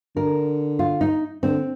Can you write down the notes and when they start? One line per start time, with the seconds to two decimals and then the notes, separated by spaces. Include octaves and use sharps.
0.16 D3 A#4
0.79 F4
1.01 D#4
1.43 D3 C4